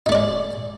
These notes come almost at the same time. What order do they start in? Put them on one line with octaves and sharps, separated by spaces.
D#4 A3 D5 G#3